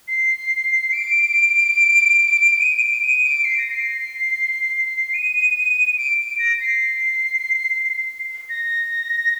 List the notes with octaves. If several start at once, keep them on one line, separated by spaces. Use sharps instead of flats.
C7
D7
D#7
D7
D#7
D7
C7
A#6
C7
D#7
D7
D7
A#6
C7
A#6